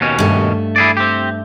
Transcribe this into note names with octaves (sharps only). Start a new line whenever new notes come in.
D#2 B2 C#4
G2 A3
E4 G#4 D5
C4 G4